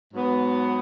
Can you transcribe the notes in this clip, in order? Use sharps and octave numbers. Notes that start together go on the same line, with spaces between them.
G#2 F#3 B3